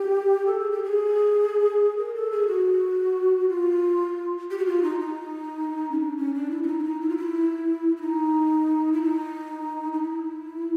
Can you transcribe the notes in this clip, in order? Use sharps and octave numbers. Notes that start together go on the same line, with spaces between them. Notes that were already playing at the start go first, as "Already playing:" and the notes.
Already playing: G4
A4
G#4
G4
G#4
A#4
A4
G#4
F#4
F4
G4
F#4
F4
D#4
D#4
C#4
D4
C#4
D4
E4
E4
D#4
D4
D#4
E4
F4
E4
E4
D#4
E4
D#4
D#4
E4